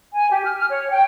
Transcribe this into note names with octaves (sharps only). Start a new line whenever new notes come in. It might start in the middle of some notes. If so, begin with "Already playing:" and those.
G#5
G4
F6
F6
C#5
G5